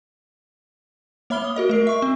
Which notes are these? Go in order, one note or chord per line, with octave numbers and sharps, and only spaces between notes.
A#3 C#5 E5 B5 F6 G7
D#6
F#4 A#4 D#5
A3 A#4 C7
E5 C#6
C4